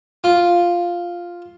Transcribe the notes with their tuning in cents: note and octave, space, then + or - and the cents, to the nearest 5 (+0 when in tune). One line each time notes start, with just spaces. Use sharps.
F4 +0